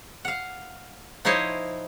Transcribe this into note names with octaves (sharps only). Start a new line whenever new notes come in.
F5 F#5
F3 D#4 E4 C5 C#5 D#5